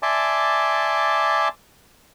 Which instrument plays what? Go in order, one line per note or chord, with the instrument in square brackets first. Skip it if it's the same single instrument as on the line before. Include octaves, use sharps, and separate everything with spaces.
[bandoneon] D5 E5 G#5 A5 C6 D6